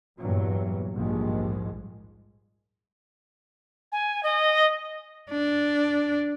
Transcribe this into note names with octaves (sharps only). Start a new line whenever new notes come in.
E2 G2 A#2 F#3
A#1 D#2 G#2 F3 G3 G#3
G#5
D#5
D4